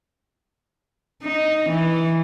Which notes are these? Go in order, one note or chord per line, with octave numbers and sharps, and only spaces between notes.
D#4
E3